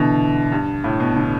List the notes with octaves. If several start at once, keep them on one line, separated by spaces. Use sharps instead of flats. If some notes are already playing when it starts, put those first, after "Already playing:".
Already playing: B2 D3 E3
G2
A2
B2
D3